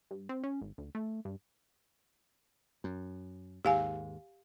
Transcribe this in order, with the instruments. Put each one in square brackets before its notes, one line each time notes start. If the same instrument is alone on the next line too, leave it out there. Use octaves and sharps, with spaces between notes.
[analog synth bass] G2
C4
C#4
G#1
D2
A3
G2
[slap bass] F#2
[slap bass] D#2 G#2 [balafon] G4 F5 G#5